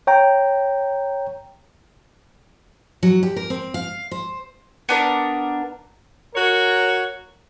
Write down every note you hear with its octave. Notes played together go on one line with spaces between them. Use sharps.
C#5 G5 A#5
F#3
G4
A#4
C4
F5
C5
B3 D4 A#4
F#4 A#4 C#5